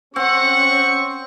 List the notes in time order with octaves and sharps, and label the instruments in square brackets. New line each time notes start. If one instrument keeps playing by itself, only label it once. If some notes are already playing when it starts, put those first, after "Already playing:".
[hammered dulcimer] C4 [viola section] C#4 [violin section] F#5 [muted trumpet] C#6